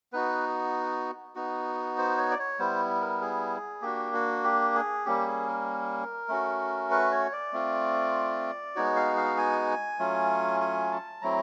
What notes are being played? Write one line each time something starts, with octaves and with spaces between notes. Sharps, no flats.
B3 D#4 F#4 B4
B3 D#4 F#4
C5
C#5
D5
C#5
G3 B3 E4 C5
A#4
G#4
A#3 D4 F#4 G4
F#4
G4
G#4
G3 A#3 C#4 G4
G#4
A#4
A3 C#4 F#4
B4
C#5
D5
A3 C4 F4
G#3 B3 D#4 F#4 C#5
F5
F5
G#5
F#3 A3 C#4 F4
G#5
A5
F#3 A3 C4 E4 A#5